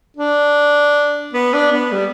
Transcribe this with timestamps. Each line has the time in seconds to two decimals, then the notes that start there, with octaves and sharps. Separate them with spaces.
0.17 D4
1.33 B3
1.53 D4
1.72 B3
1.92 G3